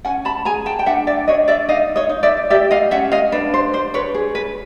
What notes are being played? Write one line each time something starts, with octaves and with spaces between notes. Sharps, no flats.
C#4 F#5 G#5
A5 B5
G#4 G#5 A#5
G5 A5
G5
D4 E5 F#5
D5 E5
D4 C#5 D#5
D5 E5
D#4 D#5 F5
C#5 D#5
D#4
D5 E5
G4 D5 E5
D#5 F5
C#4 E5 F#5
D#5 F5
D4 B4
C5
D4 C5
B4 C#5
G#4
B4